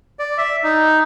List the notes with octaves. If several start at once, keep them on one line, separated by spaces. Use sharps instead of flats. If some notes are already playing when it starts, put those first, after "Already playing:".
D5
E5
D#4